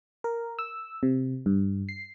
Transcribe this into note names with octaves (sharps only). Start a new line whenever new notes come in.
A#4
E6
C3
G2
C7